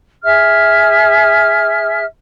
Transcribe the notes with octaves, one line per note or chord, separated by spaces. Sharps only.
G#4 E5 F6